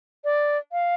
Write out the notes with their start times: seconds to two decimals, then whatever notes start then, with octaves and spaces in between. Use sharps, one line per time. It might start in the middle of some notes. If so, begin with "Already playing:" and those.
0.24 D5
0.72 F5